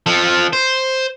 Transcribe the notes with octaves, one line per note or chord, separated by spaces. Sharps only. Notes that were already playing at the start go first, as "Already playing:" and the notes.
F3 A4
C5